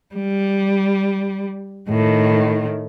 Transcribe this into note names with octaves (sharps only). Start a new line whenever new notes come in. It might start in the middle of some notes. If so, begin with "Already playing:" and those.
G3
A2 D#3